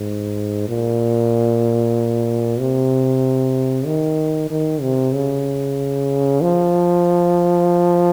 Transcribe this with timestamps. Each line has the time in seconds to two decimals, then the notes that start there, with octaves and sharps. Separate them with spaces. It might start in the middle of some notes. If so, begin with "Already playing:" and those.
Already playing: G#2
0.68 A#2
2.60 C3
3.86 D#3
4.50 D#3
4.82 C3
5.14 C#3
6.41 F3